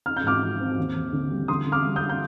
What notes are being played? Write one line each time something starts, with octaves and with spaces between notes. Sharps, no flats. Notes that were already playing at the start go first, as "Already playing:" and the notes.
D#4 F6
G6
G#2 D6 F6
F3
C4
D#2
D#2
D3
G3
D3 C6 D#6
D3
D6 F6
G3
D#6 G6
D4
G6